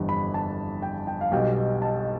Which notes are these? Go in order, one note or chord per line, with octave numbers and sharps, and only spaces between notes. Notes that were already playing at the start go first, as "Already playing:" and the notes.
Already playing: G1 F2 E3 G3
B5
A5
G5
G5
F5
B1 B2 G3 G5
A5